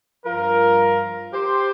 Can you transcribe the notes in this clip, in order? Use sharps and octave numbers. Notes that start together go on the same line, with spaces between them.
G2 F3 F4 A#4
G4 C5